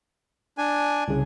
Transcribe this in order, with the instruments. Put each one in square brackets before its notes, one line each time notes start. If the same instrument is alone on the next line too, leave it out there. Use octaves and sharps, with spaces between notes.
[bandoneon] D4 G#5
[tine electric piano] C2 C#3